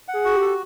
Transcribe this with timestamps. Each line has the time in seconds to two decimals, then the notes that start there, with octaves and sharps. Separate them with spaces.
0.08 F#5
0.14 G#4
0.25 F#4
0.36 G4
0.42 A4